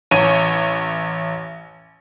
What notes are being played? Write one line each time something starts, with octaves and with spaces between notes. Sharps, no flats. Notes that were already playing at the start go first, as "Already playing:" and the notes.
A1 C#5 D#7